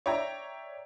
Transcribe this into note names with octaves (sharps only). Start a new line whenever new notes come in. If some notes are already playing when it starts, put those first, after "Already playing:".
C#5 D5 E5 G5 A#5